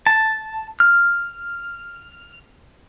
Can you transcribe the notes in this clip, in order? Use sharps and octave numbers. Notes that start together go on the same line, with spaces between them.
A5
F6